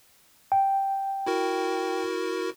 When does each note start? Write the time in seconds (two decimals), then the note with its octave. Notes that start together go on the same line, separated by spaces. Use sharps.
0.52 G5
1.26 E4 F#4 A#4